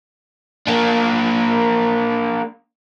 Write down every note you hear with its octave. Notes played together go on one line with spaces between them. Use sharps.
A#3 D4